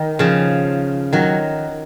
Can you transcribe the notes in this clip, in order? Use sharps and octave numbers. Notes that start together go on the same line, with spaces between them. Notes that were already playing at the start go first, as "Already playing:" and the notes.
Already playing: D#3
C#3 F3
D#3 F#3